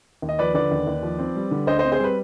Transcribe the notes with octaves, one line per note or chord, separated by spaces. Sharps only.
D#2
D#5
F3 B4 D5
D3 B4 D5
D#2
D#2
F3
C4
G3
D3
D2 C5 D#5
C4 C5 D#5
G#4 C5
G3 B4